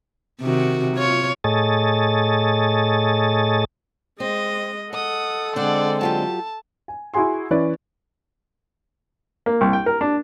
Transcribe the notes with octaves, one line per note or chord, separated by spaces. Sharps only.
C3 D#3 F#4
F4 C#5
A2 G#4 A4 C#5 D#5 A6
G#3 C4 D#5
A4 D#5 F#5 D#6
D3 G#3 C4 D4 C5 D5 F#5
F#3 F4 G4 A5
G#5
E4 F#4 G#4 G#5 C6
E3 C#4 E4 B4 D5
A#3
C2
G5
A#4
D4